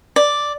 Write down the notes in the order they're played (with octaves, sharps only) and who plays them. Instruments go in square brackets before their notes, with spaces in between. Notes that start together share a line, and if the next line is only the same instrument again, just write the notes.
[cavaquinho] D5